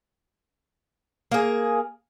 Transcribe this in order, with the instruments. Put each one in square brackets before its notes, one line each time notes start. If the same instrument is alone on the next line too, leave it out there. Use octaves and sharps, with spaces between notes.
[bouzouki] A#3 G#4